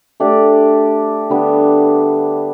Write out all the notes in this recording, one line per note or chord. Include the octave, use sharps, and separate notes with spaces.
A3 D4 G4 D5
D3 G3 B3